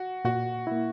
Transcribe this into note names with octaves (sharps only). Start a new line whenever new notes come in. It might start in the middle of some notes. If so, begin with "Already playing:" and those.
Already playing: F#4
A#2 F#4
A#3 E4